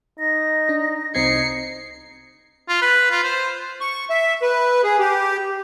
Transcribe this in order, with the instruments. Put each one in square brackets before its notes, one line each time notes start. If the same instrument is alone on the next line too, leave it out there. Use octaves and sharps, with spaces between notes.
[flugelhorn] D#4 [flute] A#6
[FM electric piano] D4
[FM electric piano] C2 C4 G#6 [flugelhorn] D#4 [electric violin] C7 C#7
[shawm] F4
B4
F4
C5
[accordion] C#6
E5
B4
G#4
G4